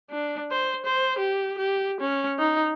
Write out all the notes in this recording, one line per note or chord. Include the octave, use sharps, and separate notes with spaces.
D4
C5
C5
G4
G4
C#4
D#4